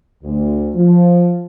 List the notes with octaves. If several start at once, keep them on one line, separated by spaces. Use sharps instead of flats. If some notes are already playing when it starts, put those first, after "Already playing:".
D2
F3